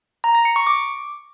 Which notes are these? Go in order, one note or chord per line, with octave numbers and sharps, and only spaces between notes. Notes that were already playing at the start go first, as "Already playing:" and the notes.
A#5
A#6
C#7
C#6
D6